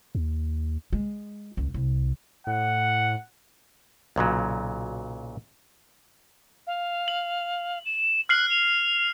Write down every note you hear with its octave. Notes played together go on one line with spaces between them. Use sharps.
D#2
G#3
C#2
C2
A2 F#5
B1 A#2 C#3 F#3
F5
F#7
E7
F6 F#6 C7 F#7
F7